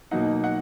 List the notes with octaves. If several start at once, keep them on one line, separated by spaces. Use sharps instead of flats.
B2 F#3 A#3 D#4 F#5
F#5